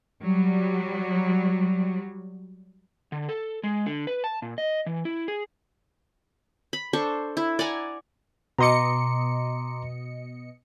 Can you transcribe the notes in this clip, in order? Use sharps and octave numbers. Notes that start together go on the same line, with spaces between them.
F#3 G3
D3
A4
G#3
D3
B4
A5
A#2
D#5
E3
E4
G#4
B5
D4 A4 C5 C#6
E4
D5 F#5 G#5 A#5
B2 D#5 A#5 C6 D6 C#7